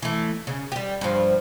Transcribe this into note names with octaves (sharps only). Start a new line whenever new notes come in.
E3 A3
C#3
G3 G4
G2 F3